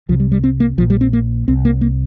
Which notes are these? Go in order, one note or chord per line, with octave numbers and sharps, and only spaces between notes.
C2 C3 F3
G3
G3
C4
A#3
A#1 A#2 F3
G3
C4
A#3
C2 C3 C4
A#3
A#3